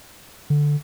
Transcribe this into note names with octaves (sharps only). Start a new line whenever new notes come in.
D3